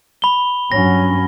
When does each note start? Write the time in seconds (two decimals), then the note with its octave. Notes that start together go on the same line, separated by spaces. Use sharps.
0.22 B5 G7
0.72 G2 F#3 C#4 A#6